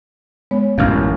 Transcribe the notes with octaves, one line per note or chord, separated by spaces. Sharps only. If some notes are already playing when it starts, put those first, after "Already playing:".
G#3 B3 C#5
A1 F#2 F5 F6